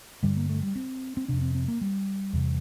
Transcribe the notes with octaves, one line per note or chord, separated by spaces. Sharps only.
G2 D3 G3
A#3
A3
G3
C4
C4
F2 C3 D4
C4
C4
A#3
G3
E2 C3